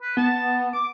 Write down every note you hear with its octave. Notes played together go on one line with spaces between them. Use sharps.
B4
B3 A5
D6 D7